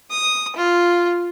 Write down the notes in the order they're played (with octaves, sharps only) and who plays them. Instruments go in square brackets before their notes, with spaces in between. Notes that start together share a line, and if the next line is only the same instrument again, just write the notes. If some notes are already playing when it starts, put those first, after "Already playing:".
[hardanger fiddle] D#6
F4